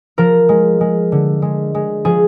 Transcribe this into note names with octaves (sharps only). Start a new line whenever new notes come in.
F3 A#4
G#3
G#3
D3
G#3
G#3
F3 G#4